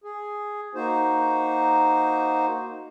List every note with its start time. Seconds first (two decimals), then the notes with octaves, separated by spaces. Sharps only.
0.04 G#4
0.75 A#3 D#4 F#4 C5